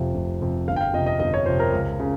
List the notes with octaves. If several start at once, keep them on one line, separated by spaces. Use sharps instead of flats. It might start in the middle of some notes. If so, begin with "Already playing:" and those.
Already playing: F1 F2 C3 F3
F1
F2 C3 F3
G1 F5
G5
F5
F2 C3 D#5
D#5
G1 D#5
C#5
F2 C3 C5
A#4
C#2
C#3